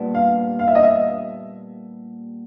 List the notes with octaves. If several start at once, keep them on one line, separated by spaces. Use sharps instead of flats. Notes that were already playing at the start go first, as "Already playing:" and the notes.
Already playing: A#2 G3 B3 D4
F5
F5
E5
D#5
E5